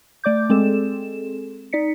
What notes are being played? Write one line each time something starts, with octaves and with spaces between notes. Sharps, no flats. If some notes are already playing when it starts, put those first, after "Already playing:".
A3 D5 D6 G6
G#3 C4 G#4 A4 E7
D#4 D5 B6 C#7